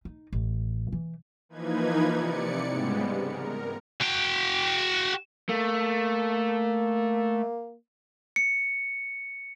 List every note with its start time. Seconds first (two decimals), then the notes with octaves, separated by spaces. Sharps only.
0.05 D#4
0.33 A1
0.92 E3
1.49 E3 F3 A#3 D#4 B4 G#6
2.11 C3 D5 C#7
2.66 G#2 C#3 G3 G#3 B3
3.21 A#4
4.01 F#4 G5
5.49 A3 A#3
8.36 C#7